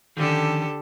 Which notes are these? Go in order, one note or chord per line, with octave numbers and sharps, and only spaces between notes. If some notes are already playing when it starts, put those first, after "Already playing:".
D3 D#3 F3 C#4 G4 A4